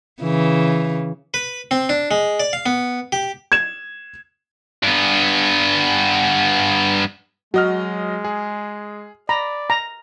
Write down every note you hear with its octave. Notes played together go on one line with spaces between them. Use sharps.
C#3 E3
B4
C4
D4
G#3
D5
F5
B3
G4
G#6 E7
G2 B3
F#3 G#3 F#4 D#5 F6
G#4
D5 A#5 B5
A#5